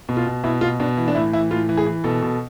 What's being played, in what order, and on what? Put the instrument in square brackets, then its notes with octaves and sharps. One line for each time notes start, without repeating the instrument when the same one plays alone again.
[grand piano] B2
F4
B2
B2 E4
B2 F4
B2 D4
E3
D4
A2 E4
E3 E4
A2 F4
E3
G#4
E3
B2 A4
B2